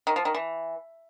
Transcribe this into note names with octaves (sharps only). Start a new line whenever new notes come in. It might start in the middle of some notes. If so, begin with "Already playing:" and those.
D#3
F3
D#3
E3